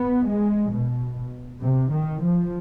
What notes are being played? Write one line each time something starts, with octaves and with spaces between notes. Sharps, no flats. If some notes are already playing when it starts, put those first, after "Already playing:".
Already playing: B3
G#3
B2
C3
D#3
F3